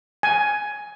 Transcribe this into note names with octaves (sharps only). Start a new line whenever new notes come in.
G#5